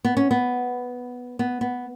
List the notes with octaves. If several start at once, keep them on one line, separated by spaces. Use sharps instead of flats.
B3
C#4
B3
B3
B3